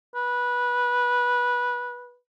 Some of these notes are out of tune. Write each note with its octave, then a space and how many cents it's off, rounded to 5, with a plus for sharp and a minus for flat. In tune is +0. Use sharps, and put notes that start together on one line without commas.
B4 -15